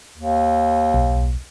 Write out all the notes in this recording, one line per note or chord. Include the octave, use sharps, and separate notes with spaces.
D#2
B1